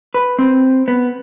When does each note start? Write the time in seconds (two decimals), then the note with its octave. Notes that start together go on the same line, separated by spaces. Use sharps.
0.14 B4
0.39 C4
0.88 B3